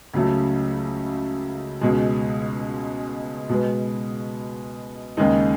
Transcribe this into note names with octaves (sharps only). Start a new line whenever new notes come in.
C#2 C#3 F#3 A3
C#2 B2 G#3
B2 G#3 B3
D#2 C#3 G#3 D#4